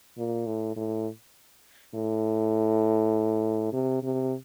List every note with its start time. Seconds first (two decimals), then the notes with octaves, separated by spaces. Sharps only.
0.18 A#2
0.46 A2
0.76 A2
1.95 A2
3.73 C3
4.03 C3